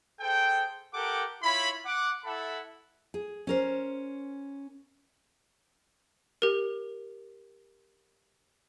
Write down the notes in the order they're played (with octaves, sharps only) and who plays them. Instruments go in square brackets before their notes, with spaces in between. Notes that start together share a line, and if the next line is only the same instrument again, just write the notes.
[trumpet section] G#4 A4 C5 G5
G4 A4 A#4 F#5 G5 D6
E4 F4 C#5 B5
F#5 D6
E4 A4 E5 F#5 A5 B5
[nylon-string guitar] G#4
C#4 A#4 C5
[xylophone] G4 A#4